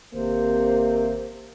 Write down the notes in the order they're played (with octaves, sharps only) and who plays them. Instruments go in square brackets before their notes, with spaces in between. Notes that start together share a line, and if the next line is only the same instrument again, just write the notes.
[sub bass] G#1 [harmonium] C3 [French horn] A#3 [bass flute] C5